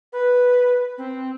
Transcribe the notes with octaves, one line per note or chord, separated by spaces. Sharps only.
B4
C4